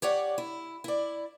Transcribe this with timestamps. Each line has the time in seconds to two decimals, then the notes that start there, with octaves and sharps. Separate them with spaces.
0.02 G4 C#5 D5 F#5
0.38 E4
0.84 E4 D5